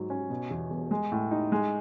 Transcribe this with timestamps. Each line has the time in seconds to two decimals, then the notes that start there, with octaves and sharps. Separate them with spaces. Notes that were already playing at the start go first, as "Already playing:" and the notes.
Already playing: G#2 F#3
0.10 C#4
0.30 B2
0.51 E2
0.70 E1
0.91 G#3
1.12 A2
1.31 D#4
1.52 G#3